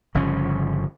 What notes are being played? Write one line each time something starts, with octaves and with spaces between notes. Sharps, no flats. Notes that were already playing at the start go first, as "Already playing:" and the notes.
G1 C#3 F3 C#4